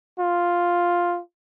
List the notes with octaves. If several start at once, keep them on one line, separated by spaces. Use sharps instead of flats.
F4